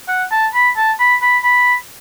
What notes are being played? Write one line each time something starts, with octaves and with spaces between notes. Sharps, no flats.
F#5
A5
B5
A5
B5
B5
B5